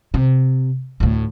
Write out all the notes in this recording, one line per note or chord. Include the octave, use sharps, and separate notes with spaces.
C3
D2 A2